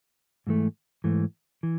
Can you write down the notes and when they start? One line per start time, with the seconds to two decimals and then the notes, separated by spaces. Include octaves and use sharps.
0.47 G#2 E3 A3
1.04 G#2 E3 A3
1.63 E3